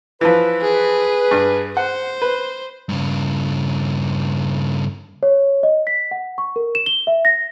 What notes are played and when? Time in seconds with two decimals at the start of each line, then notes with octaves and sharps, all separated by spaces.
0.21 E3 F3 B4
0.62 G#4
1.31 G2
1.77 C5 F#5
2.22 B4
2.89 G2 C#3
5.23 C#5
5.63 D#5
5.87 B6
6.11 F#5
6.38 C#6
6.56 A#4
6.75 E7
6.86 G7
7.07 E5
7.25 A#6